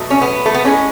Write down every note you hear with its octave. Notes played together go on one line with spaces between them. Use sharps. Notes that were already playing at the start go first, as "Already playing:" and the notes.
Already playing: B2 F#3 A3
C#4
B3
A3
B3
A2 G#3 C#4